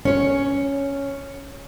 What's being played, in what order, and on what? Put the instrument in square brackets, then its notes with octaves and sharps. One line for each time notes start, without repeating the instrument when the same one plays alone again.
[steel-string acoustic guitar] C#4 C#5